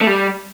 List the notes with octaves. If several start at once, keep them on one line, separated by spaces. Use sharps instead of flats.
A3
G3